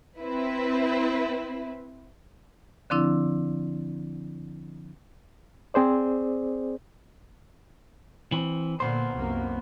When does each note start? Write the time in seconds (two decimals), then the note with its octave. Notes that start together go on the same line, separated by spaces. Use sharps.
0.20 C4 E4 B4
2.90 D3 F3 C4 D4 E4
5.74 C4 G#4 C5 D5
8.32 E3 C4
8.80 A#2 D3 A#3 B3 C5
9.13 C2 F#2 A#3